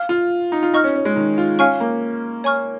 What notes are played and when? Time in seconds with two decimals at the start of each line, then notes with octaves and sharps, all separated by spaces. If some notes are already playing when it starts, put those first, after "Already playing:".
Already playing: F5 F6
0.09 F4
0.52 D#4
0.63 F4
0.74 D#4 D#5 C#6 F6
0.84 C#4
0.95 C#4
1.05 G#3
1.16 D#3
1.38 F4
1.59 C#4 F5 G#5 C#6 F6
1.80 A#3
2.44 C#5 G#5 C#6 F6